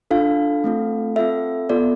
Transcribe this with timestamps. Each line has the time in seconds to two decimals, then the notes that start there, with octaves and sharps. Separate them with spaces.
0.11 D4 F4 A4 F5
0.64 A3 C4 F4 A4
1.16 C4 F4 A4 E5
1.69 B3 F4 A4 D5